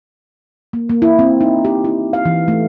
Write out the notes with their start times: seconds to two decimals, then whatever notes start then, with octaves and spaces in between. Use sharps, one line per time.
0.73 A#3
0.89 A#3
1.02 E4
1.19 C4
1.41 D#4
1.65 G4
1.84 E4
2.13 F5
2.25 E3
2.48 A3